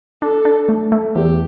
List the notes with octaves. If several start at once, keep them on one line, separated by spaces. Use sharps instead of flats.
D4 A4
D4
A3
A3
E2 G4